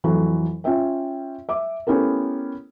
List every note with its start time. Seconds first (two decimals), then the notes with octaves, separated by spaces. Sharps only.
0.04 F2 E3 F#3 A3
0.64 C#4 F4 E5 G5
1.49 E5 D6
1.87 A3 B3 C#4 E4 G4 A#4